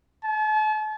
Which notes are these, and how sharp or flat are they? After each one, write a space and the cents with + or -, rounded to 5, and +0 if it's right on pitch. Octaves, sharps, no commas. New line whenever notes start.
A5 -40